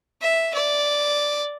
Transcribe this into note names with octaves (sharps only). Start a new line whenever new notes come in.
E5
D5